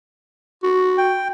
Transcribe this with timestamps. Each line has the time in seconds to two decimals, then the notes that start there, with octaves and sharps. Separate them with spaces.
0.63 F#4
0.98 G5